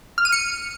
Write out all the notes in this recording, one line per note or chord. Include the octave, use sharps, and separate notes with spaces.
F6
D#7
C#7